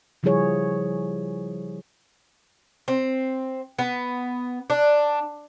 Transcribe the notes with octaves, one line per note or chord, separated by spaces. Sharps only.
C#3 F3 G3 E4 G#4 C#5
C4
B3
D4